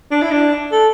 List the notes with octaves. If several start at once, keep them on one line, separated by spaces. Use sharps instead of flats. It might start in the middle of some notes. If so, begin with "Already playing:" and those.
D4
E4
D4
A4